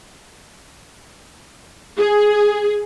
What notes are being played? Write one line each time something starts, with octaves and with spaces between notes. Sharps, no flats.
G#4